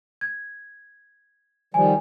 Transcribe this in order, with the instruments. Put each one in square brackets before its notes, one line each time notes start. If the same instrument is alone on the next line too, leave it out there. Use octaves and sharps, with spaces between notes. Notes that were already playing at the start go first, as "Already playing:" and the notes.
[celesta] G#6
[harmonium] D#3 F3 G3 [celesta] G#5